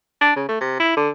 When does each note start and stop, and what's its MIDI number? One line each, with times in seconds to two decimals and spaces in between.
0.21 0.33 62
0.36 0.46 49
0.49 0.57 57
0.61 0.76 48
0.80 0.95 64
0.97 1.10 50